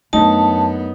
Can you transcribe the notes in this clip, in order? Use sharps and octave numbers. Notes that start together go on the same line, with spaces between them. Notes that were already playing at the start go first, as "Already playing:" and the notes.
F#2 A3 B3 D4 D#4 A5